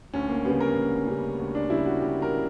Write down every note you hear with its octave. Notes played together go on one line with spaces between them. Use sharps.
D2 C#4
A#3
C#3 G3 B3
A#4
D2
C#3 G3
D2
D4
C#3 G3 E4
F#4
D2 G4
A#4
C#3